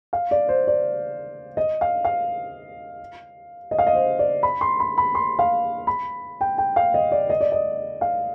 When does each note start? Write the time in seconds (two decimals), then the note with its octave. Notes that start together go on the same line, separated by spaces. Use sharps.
0.13 F5
0.31 D5
0.49 C5
0.67 D5
1.57 D#5
1.81 F5
2.05 F5
3.71 D#5
3.79 F5
3.87 D#5
3.95 C5
4.19 D5
4.43 B5
4.61 C6
4.80 B5
4.98 B5
5.15 C6
5.39 F5
5.87 B5
6.41 G5
6.58 G5
6.76 F5
6.94 D#5
7.12 D5
7.30 D#5
7.41 D5
7.52 D#5
8.01 F5